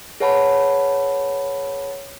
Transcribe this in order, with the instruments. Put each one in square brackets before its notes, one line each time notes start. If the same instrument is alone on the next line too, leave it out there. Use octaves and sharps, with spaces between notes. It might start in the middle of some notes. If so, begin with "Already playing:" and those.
[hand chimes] G#4 B4 C#5 F#5 A5 B5